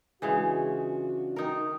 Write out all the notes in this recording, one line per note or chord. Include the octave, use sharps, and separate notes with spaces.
C#3 E3 G#3 D4 F4 F#4
D#3 D#4 A#4